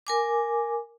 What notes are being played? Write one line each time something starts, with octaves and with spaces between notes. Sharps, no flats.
A#4 G#5 D6